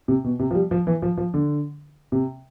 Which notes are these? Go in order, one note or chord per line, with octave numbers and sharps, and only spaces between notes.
C3
B2
C3
F3
G3
F3
E3
F3
F3
D3
C3